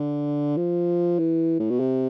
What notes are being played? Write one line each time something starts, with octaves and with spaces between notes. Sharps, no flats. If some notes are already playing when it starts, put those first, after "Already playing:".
Already playing: D3
F3
E3
A2
B2
C3